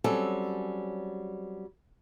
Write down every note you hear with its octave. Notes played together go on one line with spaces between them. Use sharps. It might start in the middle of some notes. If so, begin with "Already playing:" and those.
F#3 G3 C4 C#4 G#4 A4